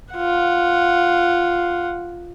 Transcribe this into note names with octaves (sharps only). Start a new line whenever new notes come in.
F4 F#5